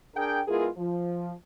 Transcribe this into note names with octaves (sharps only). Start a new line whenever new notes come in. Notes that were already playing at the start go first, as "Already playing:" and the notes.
D4 G#4 A#4 G5
G#3 B3 E4 F4 G#4 A#4
F3